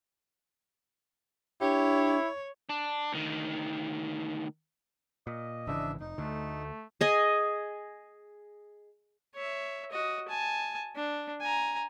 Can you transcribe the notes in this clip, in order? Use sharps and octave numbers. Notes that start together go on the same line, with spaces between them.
D4 E4 G4 C#5
D4
D2 D#3
A#2 D#5
G#1 C#3 E3 D4 E5
F1 D#4
D2 D3 A3
G#4 D#5 G#5
C#5 E5
F#4 D#5
G#5 A5
D4
G#5 A#5